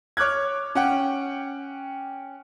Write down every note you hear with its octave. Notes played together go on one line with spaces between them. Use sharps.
C#5 D6 F6 F#6 G#6
C#4 F#5 G5